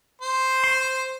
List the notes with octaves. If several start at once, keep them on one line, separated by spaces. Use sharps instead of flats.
C5
C6